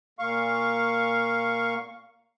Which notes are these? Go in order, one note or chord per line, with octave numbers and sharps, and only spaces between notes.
A#2 F5 C#6